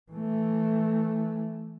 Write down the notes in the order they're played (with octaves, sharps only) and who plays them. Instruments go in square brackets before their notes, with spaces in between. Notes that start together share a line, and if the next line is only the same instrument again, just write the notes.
[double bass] E3 A3